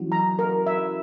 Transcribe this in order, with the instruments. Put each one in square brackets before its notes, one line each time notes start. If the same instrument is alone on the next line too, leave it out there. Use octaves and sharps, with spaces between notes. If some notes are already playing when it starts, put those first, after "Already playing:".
Already playing: [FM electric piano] E3 F#3 C#4 E4 F#4
[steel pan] A#5
A#4
E5